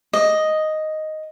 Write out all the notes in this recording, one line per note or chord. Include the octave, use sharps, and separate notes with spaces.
D#5